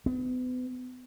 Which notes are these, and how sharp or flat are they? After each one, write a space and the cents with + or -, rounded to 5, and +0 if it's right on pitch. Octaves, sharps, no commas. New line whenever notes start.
B3 +35